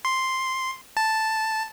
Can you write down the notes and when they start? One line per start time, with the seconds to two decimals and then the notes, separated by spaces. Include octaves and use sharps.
0.05 C6
0.97 A5